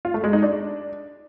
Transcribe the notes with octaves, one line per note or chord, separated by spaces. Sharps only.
F4
A3
G#3
D#4
D4